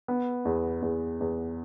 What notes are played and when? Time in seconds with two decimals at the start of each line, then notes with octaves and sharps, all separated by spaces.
0.08 B3
0.45 E2
0.82 E2
1.20 E2